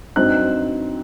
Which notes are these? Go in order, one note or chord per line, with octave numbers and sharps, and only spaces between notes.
G2 F#3 C4 D#4 F#6